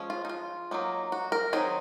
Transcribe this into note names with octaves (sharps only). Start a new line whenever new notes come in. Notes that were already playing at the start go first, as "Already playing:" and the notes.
Already playing: F3 G#3 C#4
F4
D#4
F4
F#3 A#3 D#4
F#4
A#4
D#3 F#3 C4 D#4 G#4